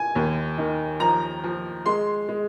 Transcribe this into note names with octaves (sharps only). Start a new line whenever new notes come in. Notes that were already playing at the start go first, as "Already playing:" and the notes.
Already playing: G#5
D#2
D#3
F3 A#5
F3
G#3 C6
G#3